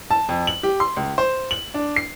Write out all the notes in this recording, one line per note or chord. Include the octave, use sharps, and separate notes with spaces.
A5
F2
F#7
G4
C6
C#2
C5
F#7
D4
C7